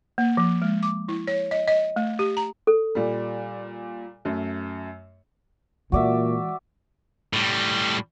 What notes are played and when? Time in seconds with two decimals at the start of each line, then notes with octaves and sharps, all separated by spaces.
0.18 A#3
0.37 F3
0.62 G#3
0.83 D6
1.08 E4
1.27 C#5
1.51 D#5
1.68 D#5
1.96 A3
2.19 G4
2.37 A#5
2.67 A4
2.95 A#2 G3
4.25 F#2 A3
5.92 A#2 E3 G#3 F#4 D5 E5
7.33 A2 G3